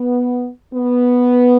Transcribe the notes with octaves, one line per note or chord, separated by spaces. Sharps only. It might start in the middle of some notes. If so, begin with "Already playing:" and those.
Already playing: B3
B3